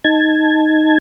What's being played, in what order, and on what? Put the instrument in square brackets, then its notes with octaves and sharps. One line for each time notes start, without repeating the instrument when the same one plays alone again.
[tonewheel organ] D#4 A5 G#6